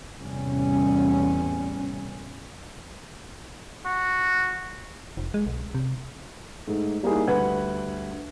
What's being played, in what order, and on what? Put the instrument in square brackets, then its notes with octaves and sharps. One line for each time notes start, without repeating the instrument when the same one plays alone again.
[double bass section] E2 A2 C3 G3 C#4
[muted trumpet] F#4
[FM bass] F1
G#3
B1
C3
[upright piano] G#2 A3
G3 A#3 D#4 E4 G#4
D2 G2 B4 F#5 G#6